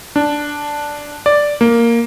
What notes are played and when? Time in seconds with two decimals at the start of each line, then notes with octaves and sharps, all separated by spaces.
0.16 D4
1.26 D5
1.61 A#3